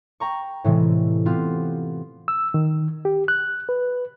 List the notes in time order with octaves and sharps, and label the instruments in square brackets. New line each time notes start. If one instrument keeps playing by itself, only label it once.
[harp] G5 A#5 C#6
A2 C3 E3 G#3
B3 C4 F4 G4
[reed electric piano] E6
D#3
G4
F#6
B4